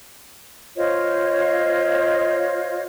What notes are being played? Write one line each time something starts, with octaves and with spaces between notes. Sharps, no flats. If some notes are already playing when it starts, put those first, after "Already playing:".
F4 C5 C#5 D#5